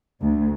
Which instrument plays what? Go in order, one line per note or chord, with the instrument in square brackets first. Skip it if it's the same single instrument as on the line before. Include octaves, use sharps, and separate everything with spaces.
[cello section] D2